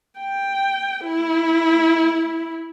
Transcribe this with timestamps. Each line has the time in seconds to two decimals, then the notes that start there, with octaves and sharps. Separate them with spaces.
0.20 G5
1.05 E4